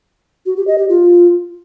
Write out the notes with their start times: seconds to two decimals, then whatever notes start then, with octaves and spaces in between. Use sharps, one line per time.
0.46 F#4
0.57 G4
0.67 D#5
0.78 G4
0.89 F4